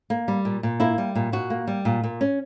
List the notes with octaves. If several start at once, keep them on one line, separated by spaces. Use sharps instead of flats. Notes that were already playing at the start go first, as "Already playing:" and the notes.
A#3
G3
A#2
A#2
A#3 E4
G3
A#2
A#2 F#4
A#3
G3
A#2
A#2
C#4